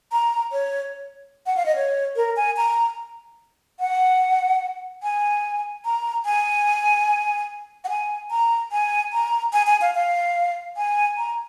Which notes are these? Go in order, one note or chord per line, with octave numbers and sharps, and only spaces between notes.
A#5
C#5
F#5
F5
D#5
C#5
A#4
G#5
A#5
F#5
G#5
A#5
G#5
F#5
G#5
A#5
G#5
A#5
G#5
G#5
F5
F5
G#5
A#5